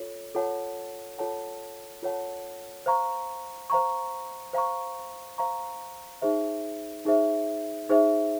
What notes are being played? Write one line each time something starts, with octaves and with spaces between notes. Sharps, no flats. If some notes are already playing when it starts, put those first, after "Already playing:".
Already playing: F4 A4 C#5
F4 A4 C#5 F#5 A5
F4 A4 C#5 F#5 A5
F4 A4 C#5 F#5 A5
C5 F5 A#5 C#6
C5 F5 A#5 C#6
C5 F5 A#5 C#6
C5 F5 A#5 C#6
D#4 G#4 C5 E5
D#4 G#4 C5 E5
D#4 G#4 C5 E5